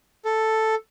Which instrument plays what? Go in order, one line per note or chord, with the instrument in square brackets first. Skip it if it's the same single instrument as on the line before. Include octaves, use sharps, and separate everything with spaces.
[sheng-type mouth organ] A4